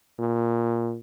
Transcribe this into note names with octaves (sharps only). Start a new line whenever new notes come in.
A#2